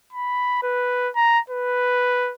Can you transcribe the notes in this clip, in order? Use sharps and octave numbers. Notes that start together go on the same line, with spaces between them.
B5
B4
A#5
B4